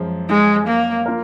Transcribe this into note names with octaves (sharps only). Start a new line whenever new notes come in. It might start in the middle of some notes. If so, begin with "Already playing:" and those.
Already playing: F#2 F3 G#3
G#3
A#3
A#3 F4 A#4